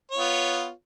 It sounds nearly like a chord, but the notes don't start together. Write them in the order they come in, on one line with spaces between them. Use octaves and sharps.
C#5 F4 B3